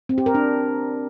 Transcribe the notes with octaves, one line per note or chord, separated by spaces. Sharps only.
C4
G4
A#4
D4